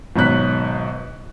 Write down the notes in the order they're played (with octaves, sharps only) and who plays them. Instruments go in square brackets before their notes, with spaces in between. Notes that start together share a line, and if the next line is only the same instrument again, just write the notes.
[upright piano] G#1 B2 F#3 F#6 B6